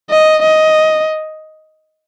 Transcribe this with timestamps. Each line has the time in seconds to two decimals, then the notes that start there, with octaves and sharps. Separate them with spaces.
0.10 D#5
0.43 D#5